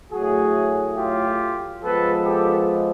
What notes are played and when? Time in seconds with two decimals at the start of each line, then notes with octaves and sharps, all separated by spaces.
0.11 A2 F#3 A3 F#4 G#4
0.96 F4 G4
1.82 F3 G#3 B3 A4 B4
2.24 G4 A4